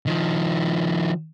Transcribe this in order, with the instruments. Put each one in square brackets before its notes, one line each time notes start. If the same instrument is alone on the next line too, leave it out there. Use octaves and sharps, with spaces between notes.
[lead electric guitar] D#3 F3